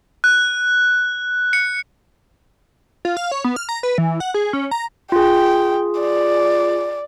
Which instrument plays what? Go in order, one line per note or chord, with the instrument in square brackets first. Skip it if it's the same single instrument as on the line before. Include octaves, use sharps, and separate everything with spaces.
[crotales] F#6
C#7
[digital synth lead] F4
F5
C#5
B3
F6
A#5
B4
E3
F#5
G#4
C#4
A#5
[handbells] F4 G#4 [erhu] G5
[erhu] D5